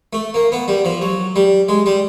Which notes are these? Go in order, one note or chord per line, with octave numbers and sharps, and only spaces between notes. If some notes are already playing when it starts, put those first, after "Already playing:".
A3
A#3
B3
G3
F3
F#3
G3
G#3
G3